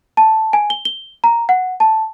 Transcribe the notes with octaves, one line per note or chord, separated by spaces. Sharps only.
A5
G#5
G7
G7
A#5
F#5
A5